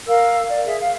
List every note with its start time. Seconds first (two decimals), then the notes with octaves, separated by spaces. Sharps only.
0.07 A#4 F5 E6
0.48 D5
0.65 G#4 E5
0.79 F5